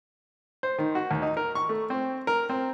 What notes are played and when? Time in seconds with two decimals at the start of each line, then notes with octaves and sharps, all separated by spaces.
0.63 C5
0.78 D#3
0.95 F#4
1.11 D#2
1.22 D#4
1.37 A#4
1.55 C#6
1.69 A3
1.90 C4
2.27 A#4
2.49 C4